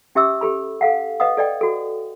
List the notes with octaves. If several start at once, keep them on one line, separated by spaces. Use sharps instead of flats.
C#4 G4 E5 D6 E6
G4 A4 B5
A4 F5 F#5
B4 D#5 F5 F#5 D#6
A4 D5 D#5 G5
F#4 A4